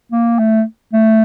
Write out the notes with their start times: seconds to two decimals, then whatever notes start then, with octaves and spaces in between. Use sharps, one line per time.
0.12 A#3
0.39 A3
0.93 A3